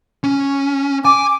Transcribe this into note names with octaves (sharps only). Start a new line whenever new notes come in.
C#4
G#5 D6